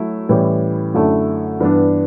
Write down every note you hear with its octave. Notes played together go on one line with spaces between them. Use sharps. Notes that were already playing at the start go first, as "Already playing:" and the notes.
Already playing: F#3 A3 E4
A2 E3 G3 C#4 G4
F#2 D3 A3 E4 A4
G2 E3 B3 D4